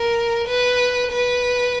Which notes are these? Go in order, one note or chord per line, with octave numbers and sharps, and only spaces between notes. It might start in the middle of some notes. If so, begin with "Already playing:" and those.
Already playing: A#4
B4
B4